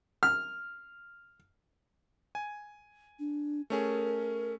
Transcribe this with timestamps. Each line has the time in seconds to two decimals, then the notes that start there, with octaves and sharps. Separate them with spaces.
0.23 F6
2.35 G#5
3.19 D4
3.70 A3 C#4 G#4 A#4